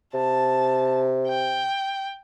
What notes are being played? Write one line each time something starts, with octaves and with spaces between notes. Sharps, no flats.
C3 A5
G5